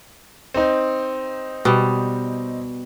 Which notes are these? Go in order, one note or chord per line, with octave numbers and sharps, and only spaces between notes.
C4 D#4
B2 G3